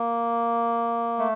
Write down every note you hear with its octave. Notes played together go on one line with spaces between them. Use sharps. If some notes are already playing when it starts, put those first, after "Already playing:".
Already playing: A#3
A3